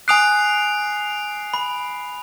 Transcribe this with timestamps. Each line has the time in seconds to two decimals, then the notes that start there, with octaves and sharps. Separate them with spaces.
0.08 G#5 D#6 F#6 C7 D7 F7
1.54 B5